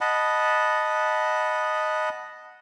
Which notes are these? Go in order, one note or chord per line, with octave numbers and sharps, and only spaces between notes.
D#5 F#5 A5 B5